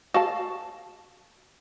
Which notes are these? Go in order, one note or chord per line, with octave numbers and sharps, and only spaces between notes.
F#4 F5 A5